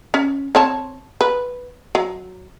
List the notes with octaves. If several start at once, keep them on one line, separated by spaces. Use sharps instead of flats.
C#4
C4 C#5 A5
B4
F#3